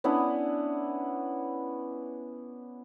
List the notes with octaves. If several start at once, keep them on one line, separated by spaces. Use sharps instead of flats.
B3 C#4 D4 E4